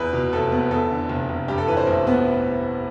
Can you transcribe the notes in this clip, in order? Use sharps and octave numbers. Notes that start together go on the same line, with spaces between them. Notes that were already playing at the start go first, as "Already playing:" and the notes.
Already playing: E2 B4
B2
F1 A4
B3
E2 A4
D3
F1
F1
G2 G4
A4
E3 B4
C5
A1
B3